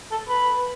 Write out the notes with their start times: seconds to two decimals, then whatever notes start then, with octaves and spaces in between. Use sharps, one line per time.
0.12 A4
0.29 B4